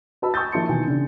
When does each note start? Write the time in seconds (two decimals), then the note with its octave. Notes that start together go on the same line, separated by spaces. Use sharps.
0.22 F#4 B4 D#5 A5 B5 E6
0.34 G#5 C#6 D#6 E6 G6 A6
0.52 F3 A#3 E4 A5 C6 C#7
0.69 B2 D#3 E3 G#5
0.87 C#3 D4